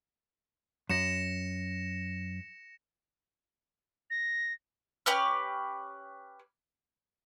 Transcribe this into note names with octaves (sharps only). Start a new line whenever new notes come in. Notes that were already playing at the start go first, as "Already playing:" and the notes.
F#2 A#6 C#7 E7
A#6
C#4 G4 B4 F6